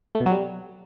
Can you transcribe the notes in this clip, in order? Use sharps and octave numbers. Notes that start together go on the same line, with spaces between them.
A3
B2
F#3
G3